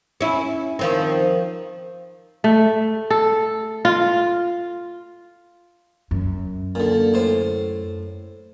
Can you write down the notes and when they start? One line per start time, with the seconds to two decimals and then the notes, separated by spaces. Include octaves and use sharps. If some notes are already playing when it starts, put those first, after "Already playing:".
0.21 C#4 E4
0.79 D#3 F3 C4
2.44 A3
3.10 A4
3.85 F4
6.11 F#2
6.75 A#2 D3
7.14 A2 C5